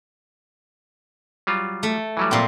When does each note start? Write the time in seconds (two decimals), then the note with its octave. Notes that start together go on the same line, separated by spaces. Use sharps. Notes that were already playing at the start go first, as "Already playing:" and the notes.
1.47 F#3 G3 F4
1.83 A3
2.17 E3 F#3 G3
2.31 A#2 C4